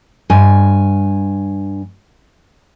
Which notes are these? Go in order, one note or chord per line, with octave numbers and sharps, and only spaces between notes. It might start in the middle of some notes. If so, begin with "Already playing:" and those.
G2 G#5